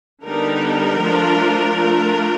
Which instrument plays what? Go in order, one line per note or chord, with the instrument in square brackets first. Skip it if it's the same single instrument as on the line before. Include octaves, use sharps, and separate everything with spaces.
[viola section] D3 G3 B3 D#4 A#4
F3 A3 D4 F4
A3 D4 F4